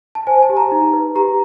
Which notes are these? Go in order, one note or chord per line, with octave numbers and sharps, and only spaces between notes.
A5
C5 G#5
A5
G4
A#5
D#4
B4
G4 A#5